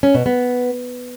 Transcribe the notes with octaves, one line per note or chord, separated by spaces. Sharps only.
C#4
B2
B3